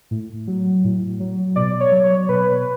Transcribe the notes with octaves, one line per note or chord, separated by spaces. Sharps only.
A2
F#3
A2
F#3
B2 D5
C#5
F#3
C#5
B2 B4